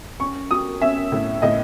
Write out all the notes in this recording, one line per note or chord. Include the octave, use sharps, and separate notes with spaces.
C#4 C#6
F#3 D#6
C#4 E5
A2
A2 D#5